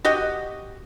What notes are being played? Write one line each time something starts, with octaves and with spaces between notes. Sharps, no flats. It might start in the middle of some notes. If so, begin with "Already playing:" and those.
F#4 G4 D#5